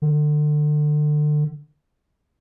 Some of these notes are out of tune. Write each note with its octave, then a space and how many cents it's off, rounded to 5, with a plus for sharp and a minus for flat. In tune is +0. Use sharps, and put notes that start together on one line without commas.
D3 +30